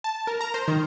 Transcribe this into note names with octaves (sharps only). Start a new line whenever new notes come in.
A5
A#4
A#5
C5
D#3